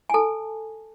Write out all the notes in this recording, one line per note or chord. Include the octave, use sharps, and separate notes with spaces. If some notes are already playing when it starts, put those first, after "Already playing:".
G#5
A4 A5